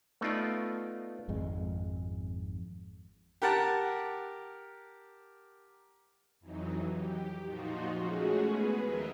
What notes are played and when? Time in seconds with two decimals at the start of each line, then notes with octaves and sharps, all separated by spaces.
0.21 A3 B3 D#4 F4 D5
1.29 G#1 F2 G#3
3.42 G4 A#4 F#5 A5 F#6
6.40 F2 E3 F#3 D#4
6.94 G4
7.46 A#2 F3 D#4 F4 F#4
7.98 G#3 A3 C#4 F#4 G#4
8.44 B3 G#4 B4
8.82 D#2 F3 A#4 D#5 E5